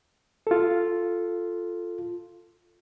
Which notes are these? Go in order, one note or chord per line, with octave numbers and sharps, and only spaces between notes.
F4 A4